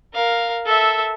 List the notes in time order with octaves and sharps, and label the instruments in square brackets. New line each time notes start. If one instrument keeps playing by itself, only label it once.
[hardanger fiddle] A#4 F5
A4 E5